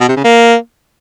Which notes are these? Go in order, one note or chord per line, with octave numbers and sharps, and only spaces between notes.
B2
C3
C#3
A#3